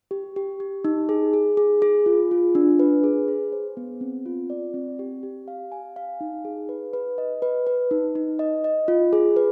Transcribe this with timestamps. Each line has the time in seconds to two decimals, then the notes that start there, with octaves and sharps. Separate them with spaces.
0.11 G4
0.36 G4
0.60 G4
0.85 D#4
1.09 G#4
1.34 G#4
1.57 G#4
1.82 G#4
2.06 F4
2.31 F4
2.55 D4
2.79 B4
3.04 G#4
3.28 G#4
3.52 C5
3.77 B3
4.01 C4
4.26 F4
4.50 D5
4.74 C4
4.99 G4
5.23 G4
5.48 F5
5.72 G#5
5.96 F5
6.21 D#4
6.45 G#4
6.69 B4
6.93 B4
7.18 D#5
7.42 B4
7.67 B4
7.91 D#4
8.15 D#4
8.39 D#5
8.64 D#5
8.88 F4
9.13 G#4
9.36 B4